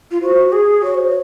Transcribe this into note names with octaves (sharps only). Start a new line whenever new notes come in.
F4
F#4 C5
G#4
F#4 C#5
C5
C#5